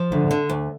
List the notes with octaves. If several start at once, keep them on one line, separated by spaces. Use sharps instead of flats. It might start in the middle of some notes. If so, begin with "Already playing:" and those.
Already playing: F3
D2 D3
D3
D2